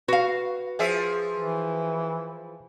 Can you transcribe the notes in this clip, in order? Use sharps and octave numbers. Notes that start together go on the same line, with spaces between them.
F#4 B4 F5
F3 G#4 E5
E3